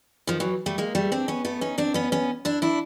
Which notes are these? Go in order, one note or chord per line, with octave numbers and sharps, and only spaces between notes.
D#3 F3
E3 F#3
G3 A3
G#3 A#3
G3 A3
C4 D4
B3 C#4
A3 B3
C#4 D#4
C4 D4
B3 C#4
B3 C#4
D4 E4
D4 E4